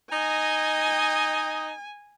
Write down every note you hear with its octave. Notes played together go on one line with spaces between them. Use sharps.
D#4 D#5 G#5